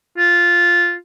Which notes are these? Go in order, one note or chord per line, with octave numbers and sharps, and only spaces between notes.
F4